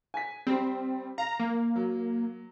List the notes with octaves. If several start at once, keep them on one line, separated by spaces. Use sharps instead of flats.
G#5 B6
G3 C4
F5 A#5
A#3
F#3